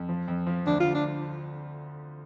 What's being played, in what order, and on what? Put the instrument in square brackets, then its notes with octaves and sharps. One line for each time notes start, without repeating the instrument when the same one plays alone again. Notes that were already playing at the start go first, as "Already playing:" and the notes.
Already playing: [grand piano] F2
F3
F2
F3
[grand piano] D2 [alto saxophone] D4
[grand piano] D2 [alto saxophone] F4
[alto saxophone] D4